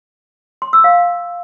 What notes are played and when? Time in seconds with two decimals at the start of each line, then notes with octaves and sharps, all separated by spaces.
0.62 C6
0.73 E6
0.84 F5